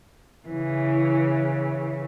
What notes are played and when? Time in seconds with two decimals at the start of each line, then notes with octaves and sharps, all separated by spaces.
0.48 C#3 E3